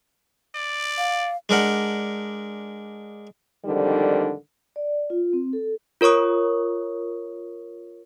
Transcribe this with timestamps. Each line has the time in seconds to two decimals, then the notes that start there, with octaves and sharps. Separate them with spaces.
0.55 D5
0.98 F5
1.49 G#3 D4 A#4 F#5
3.65 F2 G#2 D3 D#3 G3
4.76 D5
5.10 F4
5.33 C4
5.53 A4
6.01 F4 A#4 C#5 C#6 D#6